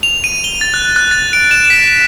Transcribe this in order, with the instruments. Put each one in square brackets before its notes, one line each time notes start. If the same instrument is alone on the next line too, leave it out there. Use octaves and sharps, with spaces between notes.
[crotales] F7
D#7
G7
A6
F#6
F#6
A6
D7
E7
B6
E7